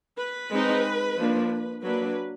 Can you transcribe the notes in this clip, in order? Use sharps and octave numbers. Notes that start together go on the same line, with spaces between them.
B4
G#3 C4 D#4
F3 A#3 D4
F#3 A#3 D4 B4